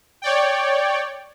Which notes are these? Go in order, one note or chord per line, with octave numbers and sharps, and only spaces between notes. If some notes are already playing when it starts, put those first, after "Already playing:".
C#5 D5 G5